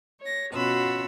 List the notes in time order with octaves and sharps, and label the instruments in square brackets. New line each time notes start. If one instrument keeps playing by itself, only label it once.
[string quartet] C#5 A#6
B2 C#4 F4 F#4 B5 E6